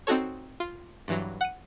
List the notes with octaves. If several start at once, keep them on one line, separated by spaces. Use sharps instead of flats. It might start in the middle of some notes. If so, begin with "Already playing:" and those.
C4 D#4 F#4 A4 C#5
F4
G2 E3 F#3
F#5 D#7